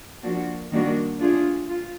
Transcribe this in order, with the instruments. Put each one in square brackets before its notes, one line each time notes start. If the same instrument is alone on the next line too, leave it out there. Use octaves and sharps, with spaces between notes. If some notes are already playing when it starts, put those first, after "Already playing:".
[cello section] F3 A#3 D4 F#4
D#3 G3 A#3 D4 F#4
A3 D4 F4 G#4
F4